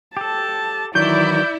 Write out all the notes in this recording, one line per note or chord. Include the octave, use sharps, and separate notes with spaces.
G4 A4 A5
D#3 E3 F#3 E4 D5 G6